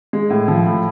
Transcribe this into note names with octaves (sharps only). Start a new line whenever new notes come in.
G#3
A2
F3
A2